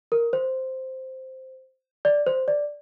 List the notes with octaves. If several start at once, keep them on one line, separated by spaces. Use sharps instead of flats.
A#4
C5
D5
C5
D5